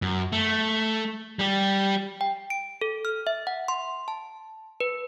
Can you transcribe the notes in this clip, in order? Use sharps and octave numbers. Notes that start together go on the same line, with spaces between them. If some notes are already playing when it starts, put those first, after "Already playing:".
F#2
A3
G3 G4
G5
D7
A4
F6
E5
F#5
C6
A5
B4